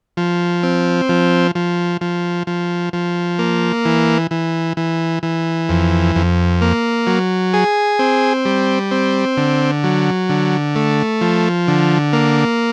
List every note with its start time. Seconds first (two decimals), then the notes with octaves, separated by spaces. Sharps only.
0.17 F3
0.63 C4
1.09 F3
1.55 F3
2.01 F3
2.47 F3
2.93 F3
3.39 A#3
3.85 E3
4.31 E3
4.77 E3
5.23 E3
5.69 F2
6.16 F2
6.62 A#3
7.07 F#3
7.53 G#4
7.99 C4
8.45 G3
8.91 C4
9.37 D3
9.84 F#3
10.29 D3
10.76 A3
11.21 F3
11.68 D3
12.13 A#3